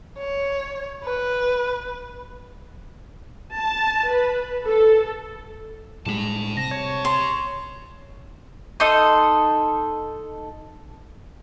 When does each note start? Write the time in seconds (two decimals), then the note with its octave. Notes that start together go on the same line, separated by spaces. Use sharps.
0.18 C#5
1.04 B4
3.59 A5
4.11 B4
4.68 A4
6.06 A2 G3 G#3 A5 B5
6.57 C3 A#6
6.71 C#5
7.05 C6
8.80 D#4 A4 C6 D#6